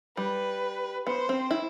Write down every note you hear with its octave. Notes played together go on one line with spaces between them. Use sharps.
G3 B4
B3 C5
C4
E4